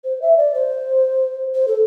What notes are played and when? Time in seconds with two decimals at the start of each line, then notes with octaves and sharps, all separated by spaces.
0.04 C5
0.22 E5
0.37 D5
0.55 C5
1.55 C5
1.68 A4